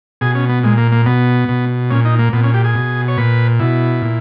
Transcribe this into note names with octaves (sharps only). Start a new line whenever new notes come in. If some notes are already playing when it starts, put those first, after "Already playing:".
B2 G#4
C#4
B3
A#2 G#3
A#3
A#3
B2 B3
B2
A#2 C#4
D#4
A#3
A#2 B3
C#4
G4
G#4
B2
C#5
A#2 B4
B2 E4
A#2